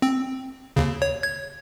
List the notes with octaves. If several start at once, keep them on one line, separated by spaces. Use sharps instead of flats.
C4
D#2 C#3
C#5
G#6